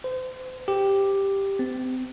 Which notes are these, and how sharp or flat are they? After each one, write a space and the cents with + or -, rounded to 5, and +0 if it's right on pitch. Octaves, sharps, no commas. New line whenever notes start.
C5 -35
G4 +5
C4 -35